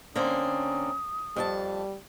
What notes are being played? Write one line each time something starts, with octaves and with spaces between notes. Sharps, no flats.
D3 A#3 C4 C#4 D#6
F2 G3 G4 A5